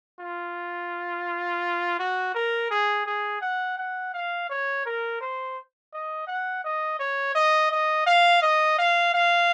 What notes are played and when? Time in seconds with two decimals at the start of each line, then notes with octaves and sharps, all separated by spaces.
0.20 F4
1.99 F#4
2.35 A#4
2.71 G#4
3.06 G#4
3.42 F#5
3.77 F#5
4.14 F5
4.50 C#5
4.85 A#4
5.21 C5
5.93 D#5
6.27 F#5
6.64 D#5
6.99 C#5
7.35 D#5
7.71 D#5
8.07 F5
8.42 D#5
8.78 F5
9.14 F5